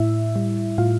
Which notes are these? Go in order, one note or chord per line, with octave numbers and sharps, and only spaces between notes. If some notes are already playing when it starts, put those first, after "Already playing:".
Already playing: A2 E4 E5
G3
A2 F4 F5